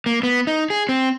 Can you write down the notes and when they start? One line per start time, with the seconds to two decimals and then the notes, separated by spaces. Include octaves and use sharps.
0.06 A#3
0.23 B3
0.47 D#4
0.70 G#4
0.89 C4